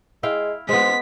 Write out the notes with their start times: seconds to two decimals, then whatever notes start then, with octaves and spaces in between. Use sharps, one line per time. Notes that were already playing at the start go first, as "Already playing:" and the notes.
0.23 G#3 E4 F5 G5
0.69 G#3 B3 C5 B6